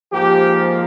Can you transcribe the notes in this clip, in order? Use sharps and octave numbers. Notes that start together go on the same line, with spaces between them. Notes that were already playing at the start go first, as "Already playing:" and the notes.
G#2 F3 A#3 G4